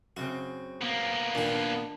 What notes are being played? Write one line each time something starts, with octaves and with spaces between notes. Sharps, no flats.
F#2 C#3 C4 F#4
A#3 B3
A#2 D#3 D4